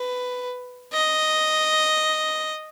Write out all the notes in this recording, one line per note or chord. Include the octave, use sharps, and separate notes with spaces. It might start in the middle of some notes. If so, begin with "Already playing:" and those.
Already playing: B4
D#5